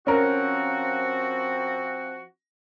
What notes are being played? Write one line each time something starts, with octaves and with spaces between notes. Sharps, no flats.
F3 C4 C#4 F#4 A#4